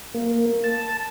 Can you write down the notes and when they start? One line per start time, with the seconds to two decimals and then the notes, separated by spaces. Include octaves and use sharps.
0.14 A#3
0.64 A5